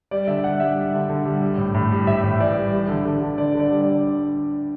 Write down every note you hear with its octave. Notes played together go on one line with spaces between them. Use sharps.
G3 D5
D3 E5
G3 F#5
G3 E5
G3
D3
D3
G3
G3
A2
A2
G3
A2 E5
A2
E3 D5
G3
G3
D3
D3
D3
D3 D5
D3
D5
G3
D5